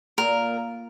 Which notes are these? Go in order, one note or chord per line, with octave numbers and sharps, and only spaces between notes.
A#2 A#4